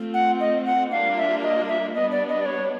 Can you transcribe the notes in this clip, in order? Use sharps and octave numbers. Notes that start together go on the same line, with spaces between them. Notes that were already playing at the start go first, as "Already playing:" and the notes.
Already playing: A3 C4 F4
F#5
D#5
F#5
G3 A#3 D4 F4 A#4 F5
E5
D#5
E5
G3 B3 D4 D#5
D5
D#5
D5
C#5